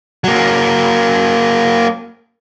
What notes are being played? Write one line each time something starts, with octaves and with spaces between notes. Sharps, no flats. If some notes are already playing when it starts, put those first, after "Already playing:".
F#3 A#3